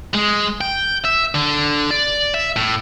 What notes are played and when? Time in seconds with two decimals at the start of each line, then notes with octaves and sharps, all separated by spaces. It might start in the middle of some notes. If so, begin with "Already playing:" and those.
0.15 G#3
0.61 G5
1.04 E5
1.35 D3
1.91 D5
2.34 E5
2.56 A2